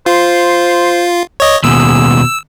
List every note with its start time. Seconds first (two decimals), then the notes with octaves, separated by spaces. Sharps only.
0.06 F4 C5
1.40 C#5 D#5
1.64 D#2 B2 G#4 E6